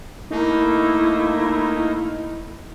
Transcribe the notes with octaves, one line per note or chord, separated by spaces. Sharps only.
A3 A#3 D#4 E4